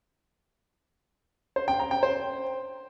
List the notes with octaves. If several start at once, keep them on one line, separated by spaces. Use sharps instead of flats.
C5
G5
A#5
G5
C5